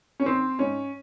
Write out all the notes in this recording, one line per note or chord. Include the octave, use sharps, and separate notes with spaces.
C#4
D#3 C4
G#2 C#4